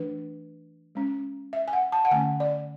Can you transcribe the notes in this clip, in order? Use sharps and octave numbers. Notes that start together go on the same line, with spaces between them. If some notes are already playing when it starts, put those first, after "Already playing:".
Already playing: E3 A3 D4 B4
G#3 C#4
E5
G#5
F#5
A5
F#5
D3 A3 C#4 G#5
D5